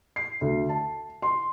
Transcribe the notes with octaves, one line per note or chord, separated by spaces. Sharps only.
C7
D2
A5
C6